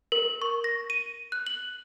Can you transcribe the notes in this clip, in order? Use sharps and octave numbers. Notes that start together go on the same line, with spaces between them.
A#4
C#6
A#6
D#7
F#6
F#7